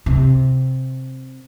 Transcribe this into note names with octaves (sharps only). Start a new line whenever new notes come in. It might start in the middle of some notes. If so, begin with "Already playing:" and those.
C3